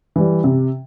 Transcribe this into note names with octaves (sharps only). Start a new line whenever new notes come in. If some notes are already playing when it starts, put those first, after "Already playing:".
E3 G3
C3